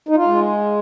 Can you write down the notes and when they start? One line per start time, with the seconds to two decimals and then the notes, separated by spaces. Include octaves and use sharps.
0.09 D#4
0.16 F4
0.27 G#3